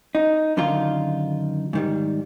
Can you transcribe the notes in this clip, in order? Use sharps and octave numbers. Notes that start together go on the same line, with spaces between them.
D#4
F#2 D3 D#3 D#4 F4
G#2 D#3 G3